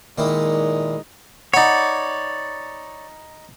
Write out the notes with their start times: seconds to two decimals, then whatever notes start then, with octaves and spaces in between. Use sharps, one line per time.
0.18 A#2 D#3 G#3 D#4 E4
1.54 D#4 C#5 D5 F#5 B5